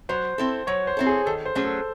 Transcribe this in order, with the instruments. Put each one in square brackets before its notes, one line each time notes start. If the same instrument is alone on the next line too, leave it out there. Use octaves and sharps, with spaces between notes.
[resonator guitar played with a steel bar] F#3 [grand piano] C5
[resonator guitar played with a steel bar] C4 E4 A4
[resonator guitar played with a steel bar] F#3 [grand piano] C#5
[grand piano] C5
[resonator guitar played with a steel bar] C4 E4 A4
[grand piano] G#4
[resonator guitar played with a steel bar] D#3 [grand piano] A4
[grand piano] C5
[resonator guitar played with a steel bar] F#3 A3 C#4 G#4
[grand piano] A4